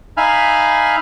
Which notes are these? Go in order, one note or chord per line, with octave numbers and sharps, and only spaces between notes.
D#4 E5 F5 G#5 B5 F6